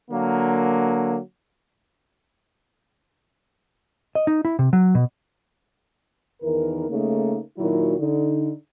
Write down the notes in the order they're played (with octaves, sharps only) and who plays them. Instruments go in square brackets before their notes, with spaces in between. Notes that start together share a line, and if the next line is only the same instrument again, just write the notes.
[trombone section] D3 F#3 A#3
[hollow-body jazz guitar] D#5
D#4
E4
C3
F#3
B2
[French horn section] E2 D#3 E3 A#4
C#3 A3 A#3 D#4
A#2 D#3 F#3 E4 F#4
D3 D#4